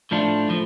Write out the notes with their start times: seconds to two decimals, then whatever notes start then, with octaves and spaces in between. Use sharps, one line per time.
0.11 A2 F3 A3 D4 F4
0.49 A2 F3